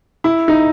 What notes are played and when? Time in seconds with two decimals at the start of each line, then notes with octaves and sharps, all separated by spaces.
0.24 E4
0.48 D#4